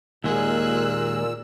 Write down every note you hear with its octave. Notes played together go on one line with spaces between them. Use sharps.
D#2 A#2 G#3 G#4 A#4 E6 F#6